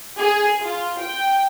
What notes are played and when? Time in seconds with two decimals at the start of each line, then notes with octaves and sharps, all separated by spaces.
0.20 G#4
0.62 F4
1.02 G5